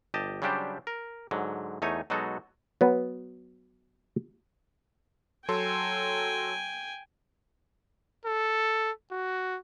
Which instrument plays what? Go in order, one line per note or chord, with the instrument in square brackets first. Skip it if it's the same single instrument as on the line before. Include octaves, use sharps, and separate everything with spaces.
[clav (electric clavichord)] G1 G4 D#5 A5
C#3 F#3 G3 D4 G4 C5
A#4
G#2 D3 F#3
E2 A3 D#4 C#5 G#5
B2 F#3 G#3 D#4 F#4 A4
F#3 B3
[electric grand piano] F#3 A4 C6 [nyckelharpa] G5 G#5
[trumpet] A4
F#4